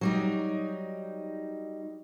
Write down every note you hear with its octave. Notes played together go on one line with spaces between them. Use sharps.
F#3 G3 D#4